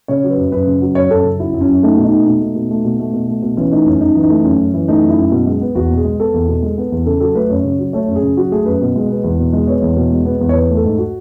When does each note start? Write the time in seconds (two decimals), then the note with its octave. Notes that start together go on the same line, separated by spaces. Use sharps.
0.08 C#3 C#5
0.24 F#3
0.30 B4
0.37 F#2
0.52 F#2 B4
0.67 C#3
0.81 F#3
0.95 F#2 C#5
1.10 F#2 A4
1.24 C#3
1.39 F#3 E4
1.54 F#2
1.61 C#4
1.69 F#2
1.83 A3 D#4
1.97 B2
2.04 D#4
2.12 A3
2.26 B2 D#4
2.41 A3
2.55 B2
2.71 A3
2.85 B2
2.99 A3
3.14 B2
3.29 A3
3.43 B2
3.57 E3 C#4
3.72 A3 D#4
3.86 F#2 C#4
4.01 F#2 D#4
4.15 E3
4.23 D#4
4.30 A3
4.44 F#2 C#4
4.59 F#2
4.74 E3
4.88 A3 D#4
5.03 F#2
5.10 E4
5.18 F#2
5.32 B2
5.47 G#3
5.61 B3
5.75 E2 F#4
5.91 B2
5.97 G#4
6.04 G#3
6.19 B3 A4
6.34 E2
6.48 B2
6.63 G#3
6.78 B3
6.92 E2
7.06 C#3 A4
7.20 F#3 A4
7.35 A3 B4
7.50 F#2 C#5
7.65 C#3
7.79 F#3
7.93 A3 C#5
8.08 F#2
8.16 G#4
8.22 C#3
8.37 F#3 F#4
8.52 A3 G#4
8.66 F#2 B4
8.81 B2
8.96 G#3
9.10 B3
9.24 E2
9.39 B2
9.53 G#3
9.67 B3 C#5
9.82 E2
9.97 B2
10.11 G#3
10.26 B3
10.41 E2
10.49 C#5
10.55 E3 B4
10.70 A3
10.77 A4
10.84 G#2
10.98 F#4